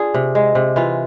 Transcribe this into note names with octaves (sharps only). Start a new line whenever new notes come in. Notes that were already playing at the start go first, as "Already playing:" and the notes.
Already playing: D4 F4 G#4
C3
G#3
C3
E3 F4